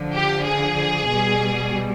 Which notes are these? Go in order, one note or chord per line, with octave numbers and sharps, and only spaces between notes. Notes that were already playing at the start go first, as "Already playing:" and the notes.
Already playing: D3 F3
G4
G#4
B2 G3